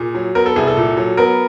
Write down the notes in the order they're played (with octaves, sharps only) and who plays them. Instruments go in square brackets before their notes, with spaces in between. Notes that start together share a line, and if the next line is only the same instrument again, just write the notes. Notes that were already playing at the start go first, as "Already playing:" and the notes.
Already playing: [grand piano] A#2 G#4
F#3
B3 A#4
A4
C2 G#4
A4
A#2
F#3
B3 A#4